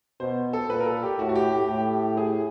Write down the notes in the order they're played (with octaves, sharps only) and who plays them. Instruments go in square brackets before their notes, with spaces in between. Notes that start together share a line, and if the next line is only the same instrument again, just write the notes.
[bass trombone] B2 [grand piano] C5
[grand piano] A4
[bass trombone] A#2 [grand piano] B4
[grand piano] A#4
A4
G4
[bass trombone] A2 [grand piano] F#4
[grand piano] F#4
G4
G4
[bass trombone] A2 [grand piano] G4
[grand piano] G#4